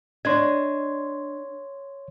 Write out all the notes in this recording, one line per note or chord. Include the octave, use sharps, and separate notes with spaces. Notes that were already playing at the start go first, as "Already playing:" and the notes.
D4 C#5 D#5 C6 G#6